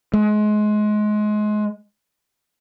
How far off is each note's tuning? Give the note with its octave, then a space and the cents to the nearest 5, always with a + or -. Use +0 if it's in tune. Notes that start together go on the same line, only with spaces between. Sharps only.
G#3 +25